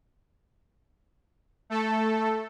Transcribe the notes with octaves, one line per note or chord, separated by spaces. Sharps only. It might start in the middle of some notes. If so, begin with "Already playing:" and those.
A3 A4